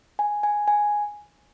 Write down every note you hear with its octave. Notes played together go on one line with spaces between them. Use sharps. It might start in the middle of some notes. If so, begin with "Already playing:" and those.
G#5
G#5
G#5